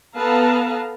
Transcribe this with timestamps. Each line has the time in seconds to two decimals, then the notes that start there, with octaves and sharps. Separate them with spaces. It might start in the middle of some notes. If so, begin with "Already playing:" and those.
0.18 B3 A4 B4 F5 A5 A#5